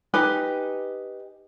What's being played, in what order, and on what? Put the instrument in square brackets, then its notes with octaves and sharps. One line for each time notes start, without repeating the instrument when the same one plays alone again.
[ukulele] D#4 G4 B4 G#5